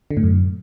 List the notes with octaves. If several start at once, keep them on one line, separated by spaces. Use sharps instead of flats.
D3
A2
F#2